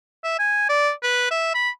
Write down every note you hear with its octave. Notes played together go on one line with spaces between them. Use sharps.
E5
G#5
D5
B4
E5
B5